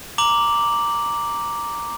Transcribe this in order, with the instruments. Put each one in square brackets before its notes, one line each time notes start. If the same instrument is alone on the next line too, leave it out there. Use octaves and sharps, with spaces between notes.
[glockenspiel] A#5 D6 F#7